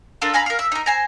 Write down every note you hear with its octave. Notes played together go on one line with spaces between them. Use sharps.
D4 F4 A4 A#4
F5 G#5 A#5 B5
A#4 F5
E5
D#4 A#4
C5 G#5 A#5